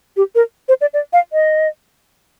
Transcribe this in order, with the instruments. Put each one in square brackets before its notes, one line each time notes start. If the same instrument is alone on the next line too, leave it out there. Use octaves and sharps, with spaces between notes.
[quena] G4
A#4
C5
D5
D5
F5
D#5